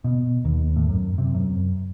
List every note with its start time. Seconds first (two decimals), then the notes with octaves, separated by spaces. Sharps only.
0.04 B2
0.45 D#2
0.76 A2
0.89 F#2
1.18 C3
1.35 F#2